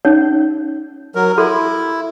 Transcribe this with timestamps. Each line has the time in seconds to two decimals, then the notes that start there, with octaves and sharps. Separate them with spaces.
0.05 C#4 D#4 C#5
1.15 F#3 A#4
1.38 E4 A4 C6